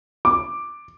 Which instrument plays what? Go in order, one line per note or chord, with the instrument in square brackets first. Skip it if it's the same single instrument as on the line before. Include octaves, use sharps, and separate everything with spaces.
[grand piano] D6